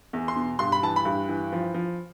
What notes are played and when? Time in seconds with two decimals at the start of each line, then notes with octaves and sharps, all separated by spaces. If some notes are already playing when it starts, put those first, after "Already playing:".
0.13 E2
0.28 C6
0.36 B2
0.59 G2 C6
0.72 B5
0.83 E3 A5
0.96 B5
1.05 G2
1.29 E3
1.52 F3
1.74 F3